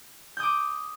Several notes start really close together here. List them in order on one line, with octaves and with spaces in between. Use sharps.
G6 D#6 D6